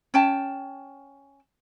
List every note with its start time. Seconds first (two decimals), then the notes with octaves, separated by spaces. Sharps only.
0.14 C#4 G5 A5